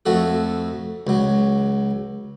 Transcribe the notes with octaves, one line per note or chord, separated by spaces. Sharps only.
F2 A3 F#4 A4
C#2 F#3